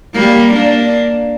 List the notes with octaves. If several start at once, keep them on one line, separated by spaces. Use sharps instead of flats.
G3 A#3
A#3 D4